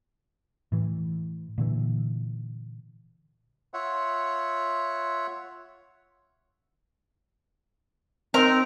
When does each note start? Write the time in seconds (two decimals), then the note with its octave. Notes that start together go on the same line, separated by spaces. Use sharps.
0.72 A2 E3
1.58 A#2 D3 E3
3.74 F4 C#5 E5 F#5
8.34 C4 D#4 A#4